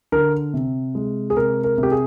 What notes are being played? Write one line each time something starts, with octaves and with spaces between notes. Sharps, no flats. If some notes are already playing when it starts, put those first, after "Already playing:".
D3 A#4
C3
G#3
G#4
C3 A#4
A#4
C3
G4
G#4